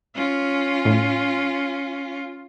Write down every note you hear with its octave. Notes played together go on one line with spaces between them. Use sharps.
C#4 F4
A2